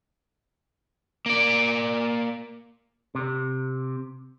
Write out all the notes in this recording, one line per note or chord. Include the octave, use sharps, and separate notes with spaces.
A#3 D5
C3